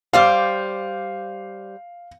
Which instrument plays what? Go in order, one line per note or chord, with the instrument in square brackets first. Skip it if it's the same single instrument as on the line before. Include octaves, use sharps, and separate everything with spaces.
[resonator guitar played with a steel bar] G3 C5 D5 [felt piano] F5